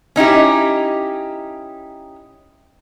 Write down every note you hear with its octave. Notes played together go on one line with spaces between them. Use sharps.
C#4 D#4 E4 G4